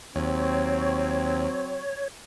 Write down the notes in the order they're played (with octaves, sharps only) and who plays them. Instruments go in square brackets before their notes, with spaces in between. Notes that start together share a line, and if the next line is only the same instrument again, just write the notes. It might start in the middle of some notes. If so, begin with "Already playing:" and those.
[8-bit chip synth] D#2 [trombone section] F#3 C4 [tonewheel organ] C#5